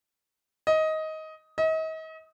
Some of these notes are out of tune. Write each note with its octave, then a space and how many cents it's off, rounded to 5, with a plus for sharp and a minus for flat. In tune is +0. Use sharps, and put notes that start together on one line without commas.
D#5 +15
D#5 +40